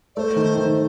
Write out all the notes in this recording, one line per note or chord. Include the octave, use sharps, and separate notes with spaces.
A3 C5 D5
D#3
D#3